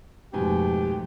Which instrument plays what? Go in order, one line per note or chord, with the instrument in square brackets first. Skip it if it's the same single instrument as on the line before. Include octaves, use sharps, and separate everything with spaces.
[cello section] F2 A3 [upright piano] G#2 B2 G#5 [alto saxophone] G4